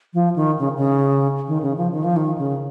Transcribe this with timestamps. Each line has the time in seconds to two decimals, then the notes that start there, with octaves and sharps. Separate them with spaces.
0.14 F3
0.36 D#3
0.59 C#3
0.77 C#3
1.48 D#3
1.63 C#3
1.77 F3
1.92 D#3
2.04 F3
2.16 D#3
2.38 C#3